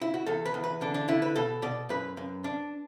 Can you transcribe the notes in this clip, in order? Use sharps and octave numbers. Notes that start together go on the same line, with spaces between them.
E4
F#4
E2 A4
B4
E2
B4
D3 D4
D4
D3 E4
B4
B2 A4
B2 D5
F#2 B4
F#2
D4